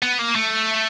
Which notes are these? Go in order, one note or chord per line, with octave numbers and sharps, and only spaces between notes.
B3
A#3
A3